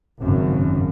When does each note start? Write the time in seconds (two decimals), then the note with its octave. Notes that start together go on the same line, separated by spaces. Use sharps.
0.20 G#1 F#2 C#3